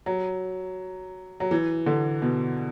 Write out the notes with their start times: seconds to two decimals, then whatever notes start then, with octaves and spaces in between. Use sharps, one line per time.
0.06 F#3
1.40 F#3
1.51 E3
1.86 D3
2.22 B2